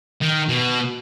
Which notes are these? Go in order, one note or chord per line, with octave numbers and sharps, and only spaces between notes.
D#3
B2